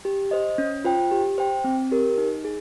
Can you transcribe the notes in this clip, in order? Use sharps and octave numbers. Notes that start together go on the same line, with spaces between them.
G4
C5 D#5
C#4
F4 C5 G5
G4
C5 G5
C4
G4 A#4
D#4
G#4